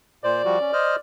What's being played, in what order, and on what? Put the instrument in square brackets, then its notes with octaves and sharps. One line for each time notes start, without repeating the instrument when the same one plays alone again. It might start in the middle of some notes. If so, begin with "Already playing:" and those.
[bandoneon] A#2 C5 [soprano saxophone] D5
[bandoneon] F3 G3 F#4
C#4
C5 D#5 F6